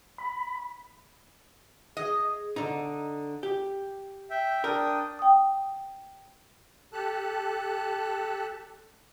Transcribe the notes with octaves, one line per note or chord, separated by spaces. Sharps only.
B5
G#4 D#5
D3 D#4
G4
E5 G5
D4 A#4 G5 D#6
G5 D#6
G4 A4 A5 F#6